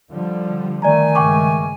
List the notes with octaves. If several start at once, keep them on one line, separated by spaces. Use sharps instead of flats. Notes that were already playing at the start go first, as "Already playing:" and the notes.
D3 F3 G3
D#3 A3 D5 G#5 A#5
G2 C#3 G#3 G5 C#6 D6